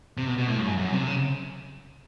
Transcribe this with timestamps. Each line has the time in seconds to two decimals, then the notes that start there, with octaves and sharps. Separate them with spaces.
0.17 C3
0.27 B2
0.38 B2
0.48 A2
0.57 G2
0.67 F#2
0.77 F#2
0.92 C3
1.07 C#3